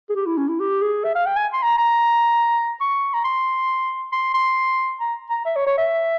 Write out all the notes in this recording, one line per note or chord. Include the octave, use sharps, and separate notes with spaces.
G#4
G4
E4
C#4
E4
G4
G#4
E5
F5
G5
G#5
C6
A#5
A#5
C#6
A#5
C6
C6
C6
A#5
A#5
E5
C#5
C#5
E5